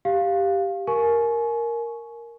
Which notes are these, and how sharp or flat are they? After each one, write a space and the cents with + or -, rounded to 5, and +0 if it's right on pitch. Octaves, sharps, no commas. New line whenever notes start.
G4 +0 F5 +0
A#4 +0 G#5 +30 C#6 +0